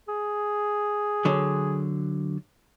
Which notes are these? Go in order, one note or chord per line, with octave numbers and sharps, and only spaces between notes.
G#4
D3 F#3